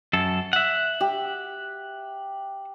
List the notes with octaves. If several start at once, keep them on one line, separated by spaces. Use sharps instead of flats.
F#2 A4
E5 F#5
G4